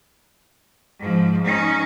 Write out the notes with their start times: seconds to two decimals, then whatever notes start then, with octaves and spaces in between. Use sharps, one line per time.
0.99 G#2 F3
1.44 C#4 D#4